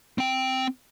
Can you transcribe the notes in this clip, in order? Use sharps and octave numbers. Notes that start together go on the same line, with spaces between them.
C4 G5